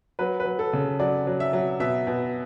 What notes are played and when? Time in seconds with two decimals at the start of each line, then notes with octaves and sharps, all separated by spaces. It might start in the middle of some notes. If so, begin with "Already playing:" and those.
0.19 F#3 B4
0.40 B4
0.45 F#3
0.59 A4
0.73 C#3
1.00 F#3 D5
1.27 F#3
1.40 E5
1.53 F#3
1.80 B2 E5
2.07 B2